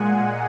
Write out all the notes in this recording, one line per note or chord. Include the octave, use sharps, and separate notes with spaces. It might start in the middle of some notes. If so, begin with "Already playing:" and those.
Already playing: A#2 G#3 F#5 G#5